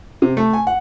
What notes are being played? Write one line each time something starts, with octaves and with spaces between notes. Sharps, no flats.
C3
A3
G#5
F#5